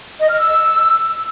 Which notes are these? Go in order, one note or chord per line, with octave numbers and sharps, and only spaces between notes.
D#5
F6
E6